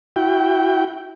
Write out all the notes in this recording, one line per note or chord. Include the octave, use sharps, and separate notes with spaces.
E4 F#4 G5